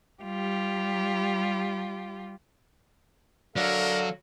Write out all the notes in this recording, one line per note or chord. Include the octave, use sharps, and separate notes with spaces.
G3 F4 G4
D3 F#3 A4 A#4 F5